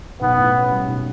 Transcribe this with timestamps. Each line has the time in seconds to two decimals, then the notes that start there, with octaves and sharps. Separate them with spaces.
0.21 B1 B3
0.37 A2
0.55 C#4
0.71 G3
0.88 B1